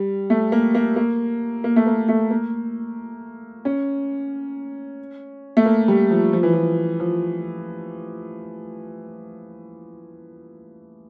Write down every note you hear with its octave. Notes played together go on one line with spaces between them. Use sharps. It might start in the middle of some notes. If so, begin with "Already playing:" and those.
Already playing: G3
A3
A#3
A#3
A#3
A#3
A3
A#3
A3
A#3
C#4
A3
A#3
G3
F3
F3
E3
F3
F3